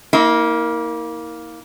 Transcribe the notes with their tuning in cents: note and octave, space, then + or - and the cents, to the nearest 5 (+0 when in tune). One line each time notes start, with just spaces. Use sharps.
A#3 +0 E4 -45